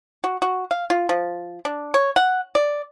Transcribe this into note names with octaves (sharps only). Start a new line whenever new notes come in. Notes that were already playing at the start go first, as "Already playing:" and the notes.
F#4
F#4
F5
F4
F3
D4
C#5
F#5
D5